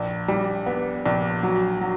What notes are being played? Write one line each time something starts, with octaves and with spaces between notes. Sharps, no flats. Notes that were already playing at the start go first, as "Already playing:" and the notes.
Already playing: A#1
G3
B3
A#1
F#3
F#3